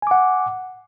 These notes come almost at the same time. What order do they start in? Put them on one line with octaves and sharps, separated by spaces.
G#5 D6 F#5